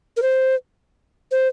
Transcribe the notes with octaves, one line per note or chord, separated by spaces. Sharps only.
A#4
C5
C5